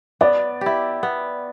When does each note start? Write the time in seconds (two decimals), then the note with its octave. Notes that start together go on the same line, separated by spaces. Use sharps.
0.21 B3 D5
0.61 E4 G4
1.03 B3